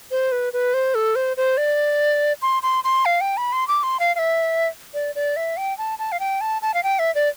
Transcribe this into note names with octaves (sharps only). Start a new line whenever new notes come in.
C5
B4
B4
C5
A4
C5
C5
D5
C6
C6
C6
F5
G5
B5
C6
D6
C6
F5
F5
E5
D5
D5
E5
G5
A5
A5
F5
G5
A5
A5
F5
G5
E5
D5